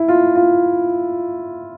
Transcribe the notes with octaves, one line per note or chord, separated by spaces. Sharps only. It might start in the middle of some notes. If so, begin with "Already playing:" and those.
Already playing: E4
F4
F4